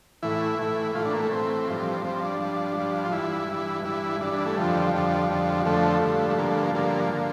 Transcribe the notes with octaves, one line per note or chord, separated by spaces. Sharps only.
A2 E3 E4
A2 E3
A2 E3 F4
D4
A#3
A3
A2 E3 C4
G2 F3
G2 F3 C4
D4
G2 F3
G2 F3
F4
G2 E3 E4
G2
E3
G2 E3 E4
G2 E3 D4
D4
A3
F2 D3 F3 G3
F2 D3 F3
F2 D3 F3
G3
F2 D3 F3 A3
G2 D3 F3
A3
G2 D3 F3 A#3
A3
A#3
G2 D3 F3 A#3
D3 F3